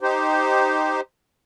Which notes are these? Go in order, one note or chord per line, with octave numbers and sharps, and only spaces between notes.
D#4 G4 C5